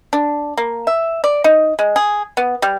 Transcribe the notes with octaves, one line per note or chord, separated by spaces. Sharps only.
D4
A#3
E5
D5
D#4
G#3
G#4
B3
G3